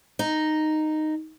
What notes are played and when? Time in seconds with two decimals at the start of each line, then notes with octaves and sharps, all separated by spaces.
0.19 D#4